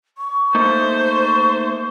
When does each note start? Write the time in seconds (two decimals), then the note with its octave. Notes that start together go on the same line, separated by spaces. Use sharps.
0.18 C#6
0.55 A3 A#3 D#4 C5